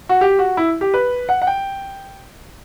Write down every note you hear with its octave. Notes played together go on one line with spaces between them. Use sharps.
F#4
G4
F#4
E4
G4
B4
F#5
F#5
G5